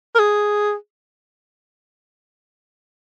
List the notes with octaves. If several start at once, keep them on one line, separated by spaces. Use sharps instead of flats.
A#4
G#4